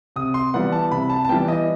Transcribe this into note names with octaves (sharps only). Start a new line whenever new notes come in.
C3 D#6
C6
E3 G3 B3 F#5
A5
C3 B5
A5
A5
E3 G3 B3 G5
D#5